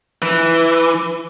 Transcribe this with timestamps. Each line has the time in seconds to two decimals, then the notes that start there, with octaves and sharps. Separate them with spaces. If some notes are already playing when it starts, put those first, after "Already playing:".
0.22 E3